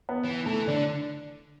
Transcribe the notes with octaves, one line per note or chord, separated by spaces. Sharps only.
B3
E3
E3 A3
D3 D4